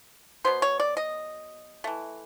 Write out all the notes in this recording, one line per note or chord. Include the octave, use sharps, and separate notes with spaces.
B2 F#3 B3 C5
C#5
D5
D#5
E3 A3